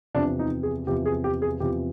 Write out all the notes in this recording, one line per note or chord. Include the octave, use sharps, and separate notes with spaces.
E2 C3 F3 D4
D#4
G#4
E2 C3 F3 G4
G#4
G4
G#4
E2 C3 F3 G4